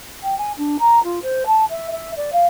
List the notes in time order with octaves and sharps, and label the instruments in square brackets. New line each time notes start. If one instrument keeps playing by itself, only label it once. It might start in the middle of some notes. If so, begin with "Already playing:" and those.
[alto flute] G5
G#5
D4
A#5
F4
C5
A5
E5
E5
D5
F5